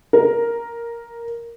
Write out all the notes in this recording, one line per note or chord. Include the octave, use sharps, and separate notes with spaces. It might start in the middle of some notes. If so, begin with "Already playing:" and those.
A#4